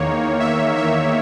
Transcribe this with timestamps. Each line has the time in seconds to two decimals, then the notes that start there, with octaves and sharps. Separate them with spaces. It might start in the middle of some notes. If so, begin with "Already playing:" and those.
Already playing: E2 D#3 A#3 C#5
0.40 E5
0.76 E5